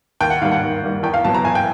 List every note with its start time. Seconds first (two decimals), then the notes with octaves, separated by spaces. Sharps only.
0.21 D#2 G5
0.30 F#5
0.42 D#3 G3 A#3 F5
0.51 F#5
0.62 D#2
0.82 D#3 G3 A#3
1.03 E2 G5
1.14 F5
1.24 B2 F#3 B3 A5
1.35 A#5
1.45 E2 G#5
1.55 G5